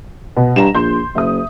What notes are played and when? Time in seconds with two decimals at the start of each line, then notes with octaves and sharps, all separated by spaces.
0.37 B2
0.56 G2 A#5 E7
0.75 A#1 C6 G6
1.15 F#1 E5 D#6